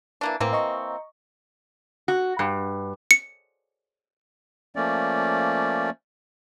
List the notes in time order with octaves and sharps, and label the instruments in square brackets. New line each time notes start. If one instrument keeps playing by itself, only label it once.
[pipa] E3 A#3 D4
[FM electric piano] A2 [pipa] E3 A#3 C4
[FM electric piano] D#5 A#5 C#6
[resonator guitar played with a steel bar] F#4
G2
[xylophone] C#7
[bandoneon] F3 A3 A#3 C#4 D5